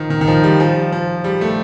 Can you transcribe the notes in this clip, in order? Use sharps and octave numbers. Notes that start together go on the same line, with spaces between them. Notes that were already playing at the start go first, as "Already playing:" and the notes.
Already playing: D#3 F3
D#3
D#3
F3
G3
F3
F3
G3
A3